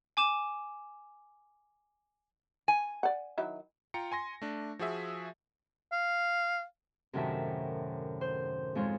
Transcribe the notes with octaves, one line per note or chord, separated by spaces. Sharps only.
G#5 D6 E7
G#5
D5 F#5
D#3 F#3 E4
F4 G5 A#5 C#7
G#5 C6 A#6
A3 D4
F3 F#4 G#4 E5
F5
F#2 A2 C3 D#3 E5 A5
C5
F2 G#2 G#3 F4 C#5